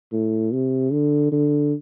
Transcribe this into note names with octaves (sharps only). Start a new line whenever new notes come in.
A2
C3
D3
D3